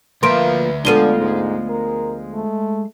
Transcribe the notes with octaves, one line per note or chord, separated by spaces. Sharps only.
D2 F3 A#3 B4 E5 C6 D7
D2 F3 G#3 B3 D4 A4 D#7 G7
G#2
A#4
A3